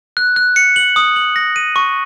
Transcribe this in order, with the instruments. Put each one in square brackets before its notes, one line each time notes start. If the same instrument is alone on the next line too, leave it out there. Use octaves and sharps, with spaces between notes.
[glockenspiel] F#6
F#6
C#7
F#7
D#6
F#7
A#6
D#7
C#6